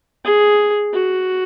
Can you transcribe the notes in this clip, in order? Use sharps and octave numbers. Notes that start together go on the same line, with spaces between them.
G#4
F#4